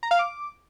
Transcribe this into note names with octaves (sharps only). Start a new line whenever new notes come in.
A#5
F5
D6